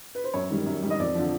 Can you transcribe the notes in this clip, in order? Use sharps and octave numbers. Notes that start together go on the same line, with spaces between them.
B4
C5
F#2 C#5
D#3 G3
F#2
D#3 G3
D#5
F2 D5
D3 F3